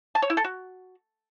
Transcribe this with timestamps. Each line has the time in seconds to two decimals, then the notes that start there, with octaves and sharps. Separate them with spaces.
0.15 A5
0.22 C#5
0.30 E4
0.37 A4
0.44 F#4